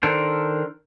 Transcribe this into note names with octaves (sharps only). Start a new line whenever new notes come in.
D#3 D4 A4 A#4 C5